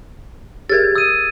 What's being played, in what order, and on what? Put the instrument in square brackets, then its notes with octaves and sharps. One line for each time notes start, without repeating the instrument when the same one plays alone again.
[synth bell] G4 G#4 A#4 [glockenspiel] G#6 A6
[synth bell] D#6 [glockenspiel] E6 D#7